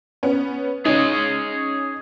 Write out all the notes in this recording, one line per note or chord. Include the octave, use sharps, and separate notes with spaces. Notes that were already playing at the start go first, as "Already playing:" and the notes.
B3 C#4
C#4 D#4 G#4 C#5 D#5